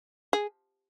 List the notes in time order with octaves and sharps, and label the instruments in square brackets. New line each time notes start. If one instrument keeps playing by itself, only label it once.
[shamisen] G#4